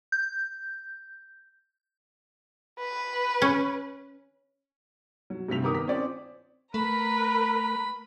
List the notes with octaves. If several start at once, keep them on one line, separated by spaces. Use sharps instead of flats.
G6
B4
C#4
F#3
G2 C3 A3 B6 F7
G1 D#3 B3 A#4 D6 D#6
B6
C4 C#4 F4 D5 D6
A3 A#4 B4 A#5 B5